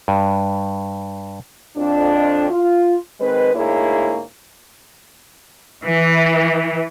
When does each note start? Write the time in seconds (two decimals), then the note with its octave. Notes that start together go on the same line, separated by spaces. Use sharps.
0.08 G2
1.76 F2 D4
2.50 F4
3.20 D#3 G#3 C4 B4
3.54 D2 G#2 A#3 E4 G#4 C#5
5.84 E3